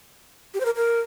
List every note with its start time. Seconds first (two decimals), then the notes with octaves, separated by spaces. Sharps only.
0.54 G4
0.60 C5
0.65 A#4
0.76 A#4